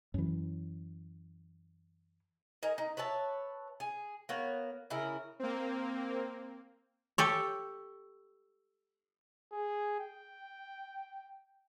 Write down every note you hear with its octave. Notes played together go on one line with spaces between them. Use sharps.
F#2 E3
D#4 A#4 G#5
D#4
B4 C#5 E5 A5
G#4
A#3 B3 C#5
C#3 E4 A#4
A#3 C4
G4 A4 C#5
G#4
G5